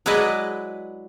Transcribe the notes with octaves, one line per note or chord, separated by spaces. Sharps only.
F#3 G#3 E4 B4 D5 D#5